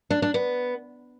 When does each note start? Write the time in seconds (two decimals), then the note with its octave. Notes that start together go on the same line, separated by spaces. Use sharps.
0.10 D4
0.22 D4
0.34 B3